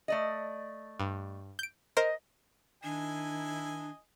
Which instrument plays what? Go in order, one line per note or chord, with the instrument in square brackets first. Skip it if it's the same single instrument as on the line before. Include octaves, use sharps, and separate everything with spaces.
[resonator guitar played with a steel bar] A3 D5 D#5
[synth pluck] G2
G6 D7
[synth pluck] A#4 C5 [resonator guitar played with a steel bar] D#5
[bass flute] D#3 [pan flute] D4 [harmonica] E4 D#5 G#5